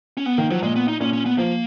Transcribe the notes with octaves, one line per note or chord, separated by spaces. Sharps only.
C#4
B3
D#3 A#3
F3 F#3
A#2 G#3
B3
D#4
A#2 C#4
C#4
B3
F3 A#3